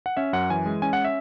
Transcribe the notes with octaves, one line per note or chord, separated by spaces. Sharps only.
F#5
C#4 E5
F#2 F#5
E3 G#5
G#3
C#4 G#5
F#5
E5